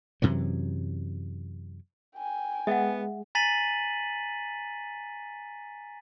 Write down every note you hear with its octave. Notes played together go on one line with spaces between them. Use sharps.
F#2 C3 E3 F#3
G5 G#5
G#3 B3 G#4 E5 F#5
G#5 A#5 A6 B6 D#7 F#7